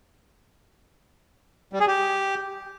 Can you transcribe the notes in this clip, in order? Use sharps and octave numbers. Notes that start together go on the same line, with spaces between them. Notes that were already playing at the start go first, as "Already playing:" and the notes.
G3
G#4
G4